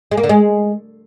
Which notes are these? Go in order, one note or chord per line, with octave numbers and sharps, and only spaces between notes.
G#3
A#3
D3
G#3